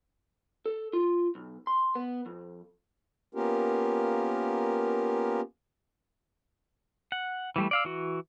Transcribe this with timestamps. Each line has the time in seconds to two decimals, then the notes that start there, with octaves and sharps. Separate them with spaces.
0.66 A4
0.93 F4
1.35 B1
1.67 C6
1.95 B3
2.26 F2
3.35 A#3 B3 C#4 F4 G4 A#4
7.12 F#5
7.56 E3 G3 A3
7.71 D5 F5 E6
7.85 E3 F#4